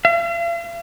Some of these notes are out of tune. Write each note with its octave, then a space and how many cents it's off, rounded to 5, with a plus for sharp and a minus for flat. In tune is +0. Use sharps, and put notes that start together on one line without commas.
F5 -45